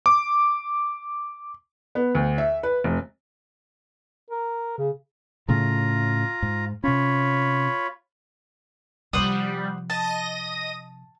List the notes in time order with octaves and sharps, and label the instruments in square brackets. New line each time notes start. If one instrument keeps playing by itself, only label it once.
[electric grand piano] D6
[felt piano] B3
D2
E5
B4
F1
[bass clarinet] A#4
C#3
[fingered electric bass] A2 C#3 A3 [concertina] F4 A#5
[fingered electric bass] G#2
[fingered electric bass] C3 C#4 [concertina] F4 C#5 B5
[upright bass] C3 F3 [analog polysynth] G3 [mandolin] C5 F#5 D#6
[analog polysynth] D#5 A#6 D#7 [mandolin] A5